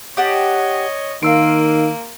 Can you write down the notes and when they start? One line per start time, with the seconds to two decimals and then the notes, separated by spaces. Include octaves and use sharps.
0.17 G4 C#5 D#5 F#5 A5
1.23 D#3 A#3 F5 C6 E6 D7